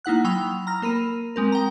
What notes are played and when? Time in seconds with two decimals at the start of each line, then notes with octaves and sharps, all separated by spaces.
0.05 A#3 D#4 E4 F#5 F#6
0.24 F#3 G5 B5 D#6 E6 F7
0.67 A#5 F6 A#6
0.82 A#3 A#4 B5 D#7
1.36 G#3 C4 A#4
1.52 G5 A#5